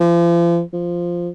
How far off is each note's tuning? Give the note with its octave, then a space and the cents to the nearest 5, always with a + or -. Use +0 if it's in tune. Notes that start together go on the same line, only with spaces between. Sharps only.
F3 -40
F3 -5